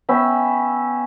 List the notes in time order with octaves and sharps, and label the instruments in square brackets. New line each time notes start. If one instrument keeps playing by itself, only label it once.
[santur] B3 C#4 E5 G5